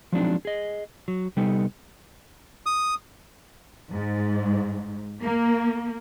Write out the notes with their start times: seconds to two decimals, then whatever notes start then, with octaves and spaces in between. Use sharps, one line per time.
0.12 F3 F#3 G#3 C4 D4 D#4
0.45 G#4 D#5
1.08 F#3
1.36 C3 G3 B3 D#4 G4 A4
2.66 D#6
3.92 G#2
5.21 A#3